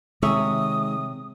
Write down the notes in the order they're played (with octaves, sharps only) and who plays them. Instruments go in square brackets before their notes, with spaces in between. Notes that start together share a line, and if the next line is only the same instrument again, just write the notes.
[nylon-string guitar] C3 C#5 E5 [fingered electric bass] D#3 G#3 [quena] D#6